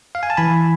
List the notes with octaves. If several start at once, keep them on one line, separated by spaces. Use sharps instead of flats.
F5
G#5
A5
E3 G#5 B5